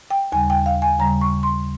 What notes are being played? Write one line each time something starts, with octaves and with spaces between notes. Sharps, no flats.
G5
D#2 C#3 G3 G#5
G5
F5
G#5
D#2 C#3 G3 A#5
C#6
C6